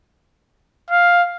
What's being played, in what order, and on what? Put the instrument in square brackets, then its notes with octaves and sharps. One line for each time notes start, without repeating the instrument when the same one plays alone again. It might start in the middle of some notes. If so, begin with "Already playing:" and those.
[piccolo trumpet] F5